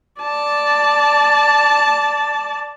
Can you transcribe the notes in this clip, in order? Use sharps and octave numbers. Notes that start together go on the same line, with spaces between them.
D5 A5